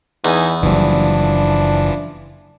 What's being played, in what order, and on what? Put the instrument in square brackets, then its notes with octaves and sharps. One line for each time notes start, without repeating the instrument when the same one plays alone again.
[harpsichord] E2 [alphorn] E3 [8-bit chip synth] D#4 G#5
[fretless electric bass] F#1 G3 [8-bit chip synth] E3 F3 [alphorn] D4